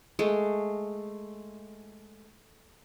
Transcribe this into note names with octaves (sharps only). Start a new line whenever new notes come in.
G#3 A3